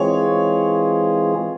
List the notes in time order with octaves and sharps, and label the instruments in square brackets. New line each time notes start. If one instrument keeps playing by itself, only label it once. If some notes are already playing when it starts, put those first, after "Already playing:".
Already playing: [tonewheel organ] E3 G#3 C4 F4 G#4 [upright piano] C#5